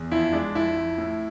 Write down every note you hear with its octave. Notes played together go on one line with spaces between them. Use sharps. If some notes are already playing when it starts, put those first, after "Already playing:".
Already playing: E2
F2 E4
G#3 D4
F2 E4
F2
A2